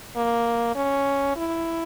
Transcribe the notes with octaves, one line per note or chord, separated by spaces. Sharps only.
A#3
C#4
E4